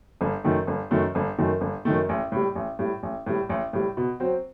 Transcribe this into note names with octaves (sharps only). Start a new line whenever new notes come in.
G1
F#2 D#3 A3
G1
F#2 D#3 A3
G1
F#2 D#3 A3
G1
F#2 D#3 A3
A1
A2 G3
A1
A2 G3
A1
A2 G3
A1
A2 G3
B2
F#3 C4